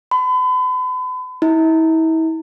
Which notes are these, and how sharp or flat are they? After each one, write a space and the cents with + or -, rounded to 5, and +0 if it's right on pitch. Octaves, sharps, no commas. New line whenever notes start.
B5 +40
E4 -40